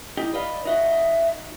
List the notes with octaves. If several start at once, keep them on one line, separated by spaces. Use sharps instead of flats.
D#4 E4 G4
B4 D5 D#5 F5
D#4 F#4 D#5 E5